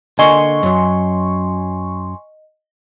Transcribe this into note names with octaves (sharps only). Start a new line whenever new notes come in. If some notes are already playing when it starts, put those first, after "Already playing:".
D3 A#3 D#5 G#5 C6 C#6 G7
F#2 F#3